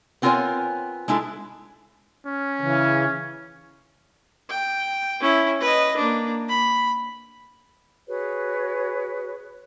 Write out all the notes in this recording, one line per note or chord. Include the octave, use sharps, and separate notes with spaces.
B3 C4 F4 A#4 C#5 G#5
G#3 D4 E4 G#4 A4
C#4
C#3 E3
G5
C#4 E4
B4 D#5
A#3 D4
B5
F#4 G#4 B4 C#5